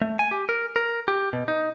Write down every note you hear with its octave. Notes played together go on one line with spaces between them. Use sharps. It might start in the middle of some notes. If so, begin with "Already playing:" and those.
A3
G#5
G4
A#4
A#4
G4
B2
D#4